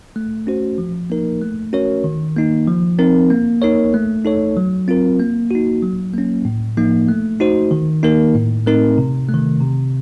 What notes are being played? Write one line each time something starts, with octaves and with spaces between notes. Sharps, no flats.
A3
C#4 F#4 C5
F3
A#3 D#4 A#4
A3
C#4 F#4 A#4 C#5
D#3
A#3 D#4
F3
C4 D#4 A#4
A#3
D#4 A#4 C#5
A3
D#4 A4 C#5
F#3
C4 F4 A#4
A#3
D#4 F#4
F#3
A#3 C#4
A2
F3 A#3 D#4
A3
D#4 F#4 C5
D#3
A#3 D#4 A#4
A2
A3 C4 D#4 A#4
C3
A3
D#3
C3